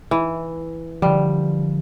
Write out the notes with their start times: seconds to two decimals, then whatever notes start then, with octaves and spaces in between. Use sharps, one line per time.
0.11 E3
1.02 D3 F3 G3